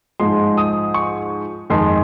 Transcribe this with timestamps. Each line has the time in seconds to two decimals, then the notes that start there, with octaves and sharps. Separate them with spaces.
0.20 G#2 F3 G#3 C6
0.57 D#6
0.94 C#6
1.70 F2 D#3 G#3 C6